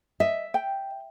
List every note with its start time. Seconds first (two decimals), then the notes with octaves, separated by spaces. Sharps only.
0.20 D#5 E5
0.54 G5